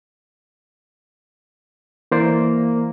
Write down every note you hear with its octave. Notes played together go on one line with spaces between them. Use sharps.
E3 A#3 C5 D5